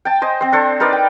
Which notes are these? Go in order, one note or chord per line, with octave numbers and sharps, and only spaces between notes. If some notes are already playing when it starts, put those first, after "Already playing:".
G5 A5
C5 D#5 G#5
C4 C5
D4 A4 C5
D#4 A#4 B4 D5
G5